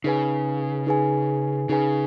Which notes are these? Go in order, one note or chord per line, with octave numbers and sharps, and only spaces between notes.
C#3 D#4 G#4 B4 G#5
D#4 G#4 B4 G#5
C#3 D#4 G#4 B4 G#5